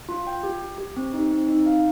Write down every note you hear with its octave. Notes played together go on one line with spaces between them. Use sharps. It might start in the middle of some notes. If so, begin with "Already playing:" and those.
F4
G5
G4
G4
G4
C4
D#4
C4
D#4
F5